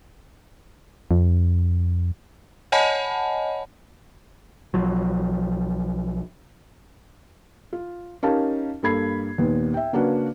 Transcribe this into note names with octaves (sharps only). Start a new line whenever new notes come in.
F2
C#5 D#5 F#5 G#5 A5 B5
B1 F3 F#3
F4
C#4 D#4 G4 A#4 F5 A5
G2 A#3 A4 B5 G#6 C7
D#2 A#2 B3
E5 G5
C#3 A#3 C#4 D4 F#4 B4